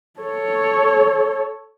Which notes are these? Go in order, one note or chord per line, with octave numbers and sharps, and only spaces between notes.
A4 C#5